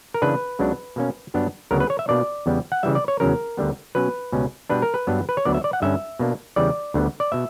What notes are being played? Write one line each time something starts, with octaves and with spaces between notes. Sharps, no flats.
A#4
C#3 E3 A#3 D4 B4
C#2 C#3 F#3 B3 D4
B2 A#3 C#4
G2 F#3 B3 D4
D2 C#3 F#3 B3 A#4
B4
C#5
E5
B2 A#3 D4 D5
E2 C#3 G3 B3
F#5
C#3 E3 G3 E5
D5
C#5
E2 C#3 F#3 C#4 A#4
D2 D3 G3 B3
B2 F#3 C#4 B4
C#2 B2 G3 C#4
B2 G3 B3 D4 B4
A#4
B4
G2 F#3 B3 D4
B4
C#5
D2 D3 F#3 B3 D4 D5
E5
D5
F#5
G2 D3 G3 C#4 E5
B2 A#3 D4
E2 C#3 E3 G3 D5
D2 D3 G3 B3
D5
B2 E5